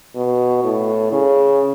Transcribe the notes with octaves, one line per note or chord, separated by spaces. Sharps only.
B2
A2
C#3